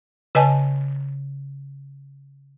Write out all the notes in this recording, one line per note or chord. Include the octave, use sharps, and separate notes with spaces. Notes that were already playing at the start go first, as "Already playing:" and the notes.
C#3 B4 D#5 G#5 A5